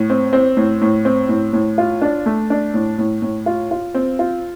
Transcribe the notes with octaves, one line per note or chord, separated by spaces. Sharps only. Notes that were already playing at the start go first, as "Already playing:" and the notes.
Already playing: A2
C4
C4
A2
A2
C4
A2
A2
F4
D4
A3
D4
A2
A2
A2
F4
F4
C4
F4